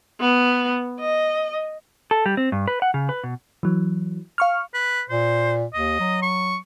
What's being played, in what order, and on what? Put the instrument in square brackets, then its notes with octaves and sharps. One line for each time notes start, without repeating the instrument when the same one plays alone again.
[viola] B3
D#5
[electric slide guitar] A4
G3
C4
G2
B4
F#5
C#3
B4
B2
[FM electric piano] E3 F#3
F5 C#6 F6
[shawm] B4
[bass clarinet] A#2 [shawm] C5
[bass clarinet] D#2 [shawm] D#5
[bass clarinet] F#3
[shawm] C#6